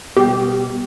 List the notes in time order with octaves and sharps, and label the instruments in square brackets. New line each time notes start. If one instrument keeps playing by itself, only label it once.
[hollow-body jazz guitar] B2 G3 [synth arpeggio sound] G4